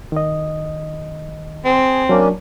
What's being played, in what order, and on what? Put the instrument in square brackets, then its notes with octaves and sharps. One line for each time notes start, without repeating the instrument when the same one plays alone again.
[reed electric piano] D#3 D#5
[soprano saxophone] C4 [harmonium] G#4
[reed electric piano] F#3 [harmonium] A#3 C#4 D4